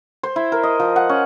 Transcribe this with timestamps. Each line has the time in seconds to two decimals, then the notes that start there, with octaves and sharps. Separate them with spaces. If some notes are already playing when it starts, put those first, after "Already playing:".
0.23 C5
0.36 E4
0.52 A#4
0.63 D#5
0.79 F3
0.96 F#5
1.09 C#4